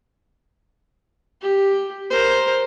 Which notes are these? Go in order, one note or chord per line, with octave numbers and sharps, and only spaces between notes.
G4
A#4 C5